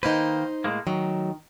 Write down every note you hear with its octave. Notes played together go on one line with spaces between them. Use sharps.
D#3 A#3 D#4 B4 C5
A2 G#3 A#3
D#3 F#3 A3